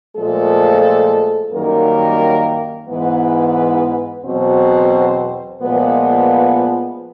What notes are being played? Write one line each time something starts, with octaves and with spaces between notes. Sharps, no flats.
A#2 F3 G#3 A3 A4
F#2 D#3 G3 A#3 A#4
G#2 E3 G#3 B3 B4
E2 B2 F#3 C4 C5
A#2 F3 G#3 B3 B4